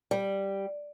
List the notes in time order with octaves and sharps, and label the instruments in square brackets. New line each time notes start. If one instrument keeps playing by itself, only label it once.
[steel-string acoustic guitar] G3